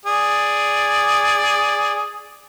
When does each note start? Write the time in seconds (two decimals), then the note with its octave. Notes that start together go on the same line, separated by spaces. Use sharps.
0.05 G#4 D5